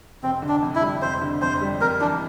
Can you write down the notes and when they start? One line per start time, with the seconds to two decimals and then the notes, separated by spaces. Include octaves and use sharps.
0.23 F1 C4
0.42 D3
0.48 D4
0.62 F2
0.75 E4
0.82 G3
1.02 F1 C5
1.22 D3
1.41 F2 C5
1.61 G3
1.81 F2 A#4
2.00 E3 D4